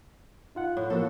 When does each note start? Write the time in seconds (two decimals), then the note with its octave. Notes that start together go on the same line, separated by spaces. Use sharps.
0.55 D#4 F4 F#5
0.77 A2
0.90 F3 A#3 F#4 A4 C5